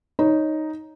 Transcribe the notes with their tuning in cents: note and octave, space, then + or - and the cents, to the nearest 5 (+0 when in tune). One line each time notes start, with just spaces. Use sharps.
D#4 +0 C#5 +0